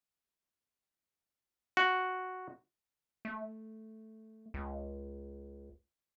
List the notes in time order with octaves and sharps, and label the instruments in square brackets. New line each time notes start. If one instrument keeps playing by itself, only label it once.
[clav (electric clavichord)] F#4
[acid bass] A3
C#2